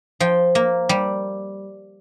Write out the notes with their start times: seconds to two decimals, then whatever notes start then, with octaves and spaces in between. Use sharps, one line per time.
0.20 F3 G5
0.55 A#3
0.89 G3